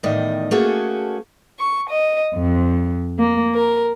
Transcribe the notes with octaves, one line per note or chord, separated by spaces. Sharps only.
E2 A2 D#3 D5 D#5
A3 A#3 C#4 F#4 G#4 A4
C#6
D#5
F2
A#3
A#4